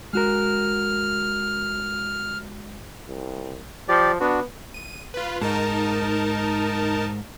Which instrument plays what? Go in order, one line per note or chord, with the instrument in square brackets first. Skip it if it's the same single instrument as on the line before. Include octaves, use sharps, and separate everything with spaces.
[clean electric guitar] G#3 F#4 A#4 [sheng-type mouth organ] F6
[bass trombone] C2
[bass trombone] F3 [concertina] G4 D5
[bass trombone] B3 [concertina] D4 F#4
[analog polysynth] D#7
F4 B4
[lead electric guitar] G#2 [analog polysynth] D#4 A#4 A5